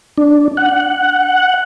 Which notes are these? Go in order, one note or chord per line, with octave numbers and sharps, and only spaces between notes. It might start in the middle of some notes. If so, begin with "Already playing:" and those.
D4
F#5